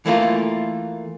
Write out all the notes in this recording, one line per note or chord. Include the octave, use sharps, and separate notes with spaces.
E3 A3 A#3 F4